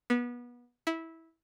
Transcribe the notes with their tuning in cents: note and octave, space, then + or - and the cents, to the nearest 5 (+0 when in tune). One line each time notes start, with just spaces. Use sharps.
B3 -25
E4 -15